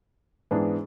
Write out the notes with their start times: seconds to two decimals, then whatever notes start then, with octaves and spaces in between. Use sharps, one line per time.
0.51 G#2 E3 B3 D4 G#4